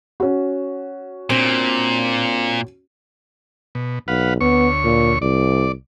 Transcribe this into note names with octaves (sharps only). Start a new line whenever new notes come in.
C#4 F#4
A#2 C4 D4
B2
B1 B4 F5 F#5
D2 B3 C#5 C#6
A#2
C2 D5